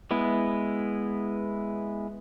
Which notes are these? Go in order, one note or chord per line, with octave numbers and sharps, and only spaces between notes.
G#3 B3 E4